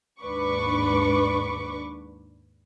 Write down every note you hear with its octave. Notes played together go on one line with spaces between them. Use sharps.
D#2 G#2 D4 B4 C#6 D6